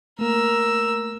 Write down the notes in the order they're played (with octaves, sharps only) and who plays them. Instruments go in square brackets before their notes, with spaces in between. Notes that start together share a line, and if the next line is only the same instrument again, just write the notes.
[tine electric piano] A3 A#3 [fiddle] A#4 E6